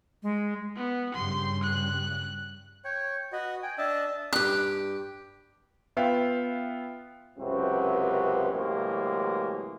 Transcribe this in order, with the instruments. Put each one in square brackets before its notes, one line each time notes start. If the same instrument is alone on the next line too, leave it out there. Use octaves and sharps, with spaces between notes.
[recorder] G#3
[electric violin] B3
[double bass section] G2 C#3 G3 [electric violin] C6
[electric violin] F#6
[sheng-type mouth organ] C#5 [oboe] G5
[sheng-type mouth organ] F#4 D#5 [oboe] B4
[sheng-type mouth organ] G5 [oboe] G#5
[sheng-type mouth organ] D4 D#5 A5 [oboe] E5
[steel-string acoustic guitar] G2 G4 [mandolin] F#6
[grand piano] B3 F4 E5 F5 G5
[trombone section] C#2 F#2 C3 C4 F#4 B4
A2 C3 E3 F#3 G#3 A#3